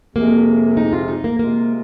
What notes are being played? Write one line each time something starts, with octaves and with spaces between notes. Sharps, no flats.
F2 C3 G#3 A#3
D#4
F4
D#4
A#3
C3 G#3 A#3 F4